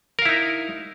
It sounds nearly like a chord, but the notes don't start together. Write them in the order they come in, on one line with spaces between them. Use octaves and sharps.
A#4 F5 E4 D#4